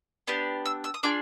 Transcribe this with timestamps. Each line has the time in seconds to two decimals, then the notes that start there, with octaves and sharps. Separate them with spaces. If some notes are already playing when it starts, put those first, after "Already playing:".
0.27 B3 D4 G4
0.66 E6
0.84 E6
0.94 D#6
1.03 D4 F4 G#4 D6